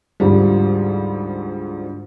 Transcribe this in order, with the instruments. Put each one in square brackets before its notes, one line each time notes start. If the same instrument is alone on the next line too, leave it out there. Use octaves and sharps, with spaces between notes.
[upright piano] D2 G#2 F3 G3